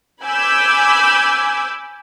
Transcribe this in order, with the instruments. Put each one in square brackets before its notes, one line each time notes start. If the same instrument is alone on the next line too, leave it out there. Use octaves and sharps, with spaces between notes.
[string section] G#5 B5 D6 E6 G6